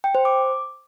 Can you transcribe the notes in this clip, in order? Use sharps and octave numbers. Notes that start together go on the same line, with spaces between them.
G5
C5
D6